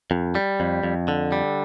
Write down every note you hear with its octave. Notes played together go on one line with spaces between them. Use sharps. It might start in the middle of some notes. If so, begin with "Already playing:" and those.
F2
G3
F2
F2
D3
G3